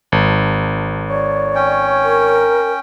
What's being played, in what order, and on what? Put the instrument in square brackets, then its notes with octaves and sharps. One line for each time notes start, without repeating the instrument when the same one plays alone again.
[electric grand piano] G#1
[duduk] C#5 [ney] D5
[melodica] C#4 G5
[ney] A#4